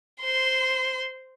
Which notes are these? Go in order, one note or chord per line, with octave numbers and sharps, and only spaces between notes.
C5 C6